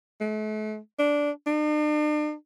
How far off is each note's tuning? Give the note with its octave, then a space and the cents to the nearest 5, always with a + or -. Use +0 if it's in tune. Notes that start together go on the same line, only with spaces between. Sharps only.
A3 -40
D4 -10
D4 +45